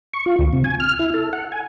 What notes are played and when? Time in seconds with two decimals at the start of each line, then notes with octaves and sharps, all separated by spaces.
0.13 C#6
0.26 F4
0.39 D2
0.53 C3
0.64 G#5
0.80 F6
0.99 E4
1.14 A4
1.33 F#5
1.52 G#5